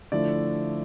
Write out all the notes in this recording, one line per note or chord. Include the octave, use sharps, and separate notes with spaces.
D3 F3 A3 E4 D5